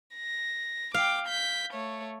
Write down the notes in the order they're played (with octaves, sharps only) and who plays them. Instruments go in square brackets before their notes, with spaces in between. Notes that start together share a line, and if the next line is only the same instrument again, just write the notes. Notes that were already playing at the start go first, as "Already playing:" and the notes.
[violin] A#6
[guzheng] F5 [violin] G5 D6
[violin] G6 B6
A3 C#5